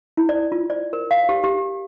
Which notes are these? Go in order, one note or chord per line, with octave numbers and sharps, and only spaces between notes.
E4
D5
F4
D5
A#4
F5
G4
G4